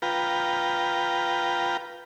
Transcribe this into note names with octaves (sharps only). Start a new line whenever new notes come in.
F4 B4 G5 A#5